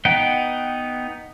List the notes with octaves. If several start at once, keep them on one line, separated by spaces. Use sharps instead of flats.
B3 D#4 B4 F#5 G5